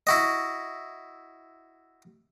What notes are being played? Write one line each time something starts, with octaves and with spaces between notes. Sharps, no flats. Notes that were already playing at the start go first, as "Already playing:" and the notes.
E4 F#4 D#5